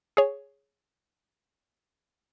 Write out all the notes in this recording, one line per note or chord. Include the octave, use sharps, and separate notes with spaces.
G#4 C#5